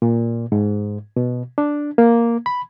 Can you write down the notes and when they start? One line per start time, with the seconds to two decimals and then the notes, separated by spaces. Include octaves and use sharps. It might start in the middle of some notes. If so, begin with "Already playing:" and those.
0.02 A#2
0.52 G#2
1.16 B2
1.58 D4
1.98 A#3
2.46 B5